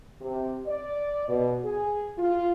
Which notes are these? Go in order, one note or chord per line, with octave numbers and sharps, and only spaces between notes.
C3
D5
B2
G#4
F4